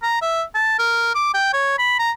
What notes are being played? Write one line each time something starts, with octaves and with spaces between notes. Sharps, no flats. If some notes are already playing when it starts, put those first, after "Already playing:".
A#5
E5
A5
A#4
D6
G5
C#5
B5
A#5